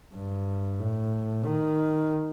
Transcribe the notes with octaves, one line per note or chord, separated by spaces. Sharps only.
G2
A2
D#3